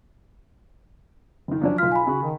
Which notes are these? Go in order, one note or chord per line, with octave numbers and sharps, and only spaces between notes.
F#1 D#3
F3 F#3 C#4 D4
B1 F4 F6 B6
G#5 B5
C#3 F#4
D#3